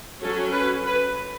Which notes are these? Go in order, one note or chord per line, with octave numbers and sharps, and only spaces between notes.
F#3 C#4 A4
B4
B4